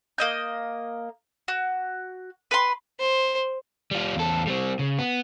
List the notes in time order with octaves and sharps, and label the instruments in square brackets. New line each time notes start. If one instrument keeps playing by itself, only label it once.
[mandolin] A#3 D#5 G6
F#4
B4 B5 C6
[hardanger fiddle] C5
[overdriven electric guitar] G3 F4
E2 A4
G3 C4
C#3
B3